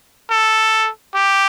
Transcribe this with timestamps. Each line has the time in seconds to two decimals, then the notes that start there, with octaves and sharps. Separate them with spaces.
0.30 A4
1.15 G4